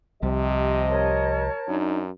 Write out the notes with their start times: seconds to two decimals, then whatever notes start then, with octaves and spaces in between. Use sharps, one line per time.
0.23 C2 C3 F3 G3 G4 D#5
0.88 A#4 C#5 A5
1.68 F#2 D4 D#4